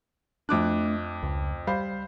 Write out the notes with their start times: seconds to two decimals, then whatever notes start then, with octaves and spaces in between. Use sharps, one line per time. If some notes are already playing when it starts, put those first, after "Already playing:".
0.49 F2 A3 D4 D6 F#6
1.23 C#2
1.67 G3 C5 F5 B5